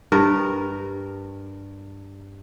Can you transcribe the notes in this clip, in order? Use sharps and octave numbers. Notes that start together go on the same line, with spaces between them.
G2 A#4